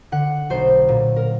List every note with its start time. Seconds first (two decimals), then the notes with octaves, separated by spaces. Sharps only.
0.12 D3 F#5
0.50 B1 C5
0.89 A#2
1.16 A#4